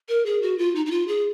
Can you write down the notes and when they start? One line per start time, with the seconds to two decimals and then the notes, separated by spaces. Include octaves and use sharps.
0.09 A#4
0.26 G#4
0.42 F#4
0.58 F4
0.75 D#4
0.86 D#4
0.91 F4
1.08 G#4